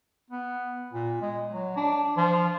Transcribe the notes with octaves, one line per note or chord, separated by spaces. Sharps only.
B3
A#2
G#3
F#3
D4
F3